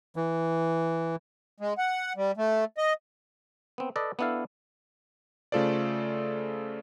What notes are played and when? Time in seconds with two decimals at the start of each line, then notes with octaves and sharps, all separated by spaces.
0.16 E3
1.60 G#3
1.78 F#5
2.16 G3
2.37 A3
2.78 D#5
3.78 B3 C4
3.96 A4 B4 D5 D#5
4.19 B3 D4 E4 A4 F5
5.52 C#3 A3 F4 A4 C5 D5